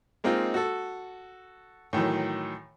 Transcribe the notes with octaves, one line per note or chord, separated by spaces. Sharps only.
G#3 A#3 C4 D#4 F4
F#4 A4
A2 D#3 E3 F#3